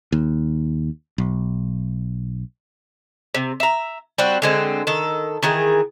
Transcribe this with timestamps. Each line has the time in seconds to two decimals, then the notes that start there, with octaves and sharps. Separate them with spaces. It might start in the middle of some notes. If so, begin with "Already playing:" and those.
0.12 D#2
1.18 B1
3.35 C3
3.60 E5 A#5
4.18 G3 C4 F#4
4.42 D3 G#3 C4
4.87 D#3 A4
5.43 D#3 E3 G#4